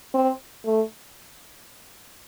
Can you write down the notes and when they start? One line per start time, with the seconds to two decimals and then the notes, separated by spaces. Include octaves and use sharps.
0.14 C4
0.65 A3